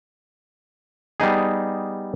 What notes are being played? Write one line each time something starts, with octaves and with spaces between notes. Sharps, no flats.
G3 B3 D#4 G#4